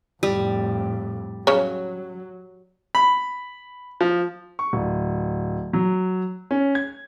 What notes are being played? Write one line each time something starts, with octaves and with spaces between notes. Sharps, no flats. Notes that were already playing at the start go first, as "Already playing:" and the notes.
F2 A2 G3
C#3 F#3 C#5
B5
F3
C#6
D1
F#3
C#4
G#6